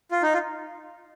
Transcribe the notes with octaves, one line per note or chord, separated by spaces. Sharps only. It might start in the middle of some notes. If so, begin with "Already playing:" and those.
F4
D#4
F4